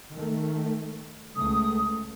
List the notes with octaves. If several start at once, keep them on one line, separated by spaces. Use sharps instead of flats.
D#3 A3
C#2 A3 D#6